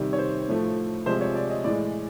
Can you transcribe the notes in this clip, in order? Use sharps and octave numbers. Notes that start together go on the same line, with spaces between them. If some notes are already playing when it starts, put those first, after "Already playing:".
Already playing: C3 D#3 G3
C#5
C5
A2 F3 A3
C3 F3 G#3 C5
C#5
D5
D#5
A2 E3 G#3 D5